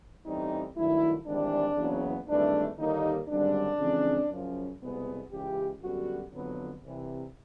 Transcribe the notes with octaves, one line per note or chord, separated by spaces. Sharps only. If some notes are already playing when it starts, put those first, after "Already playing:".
A1 G2 E3 G3 C4 D#4
G2 D#3 F#3 A3 E4
G#1 G#2 E3 G3 D4
F#1 E2 C#3 F#3 B3
G#1 G2 E3 A3 D4
D#2 D3 G3 A#3 D#4
G#1 F#2 D3 G3 D4
F2 C#3 E3 G#3 C4
F#2 C#3 F3
C2 B2 G#3 B3
C#2 C#3 E3 G4
F#2 D3 G3 B3 F#4
G1 F2 D3 F#3 B3
C2 C3 E3